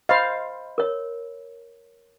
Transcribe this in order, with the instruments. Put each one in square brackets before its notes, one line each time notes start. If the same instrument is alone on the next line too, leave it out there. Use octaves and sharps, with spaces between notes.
[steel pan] C5 F5 [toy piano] D#5 B5
[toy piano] A#4 C#5